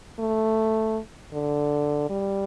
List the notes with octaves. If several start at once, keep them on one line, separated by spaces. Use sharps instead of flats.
A3
D3
G3